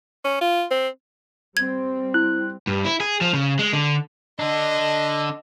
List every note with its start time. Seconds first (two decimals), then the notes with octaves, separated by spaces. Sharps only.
0.25 C#4
0.41 F4
0.71 C4
1.57 G3 C4 G#6
2.14 E4 F#6
2.67 G2
2.85 E4
3.00 G#4
3.21 F3
3.34 C#3
3.59 G#3
3.73 D3
4.39 D3 D4 D#5